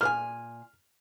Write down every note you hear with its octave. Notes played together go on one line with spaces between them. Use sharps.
A#2 B4 G#5 F6